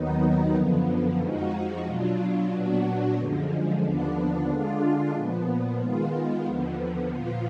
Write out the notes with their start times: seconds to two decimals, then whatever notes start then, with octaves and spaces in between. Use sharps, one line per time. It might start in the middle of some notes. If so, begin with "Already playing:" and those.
Already playing: D#2 D#3 F#3 B3 D#4
0.54 F#2 D3 F3 B3
1.19 F2 F3 G#3 D#4 F#4
1.85 B2 F#3 D4 F4
2.51 A#2 F#3 B3 D4 F#4
3.17 F#2 D3 F3 G#3
3.82 D#2 D3 F3 B3 D4
4.49 D3 G#3 D4 F4
5.14 A#2 F3 B3
5.79 D#3 G#3 B3 F4
6.45 D#2 D3 F3 B3
7.11 A#2 F3 B3 F4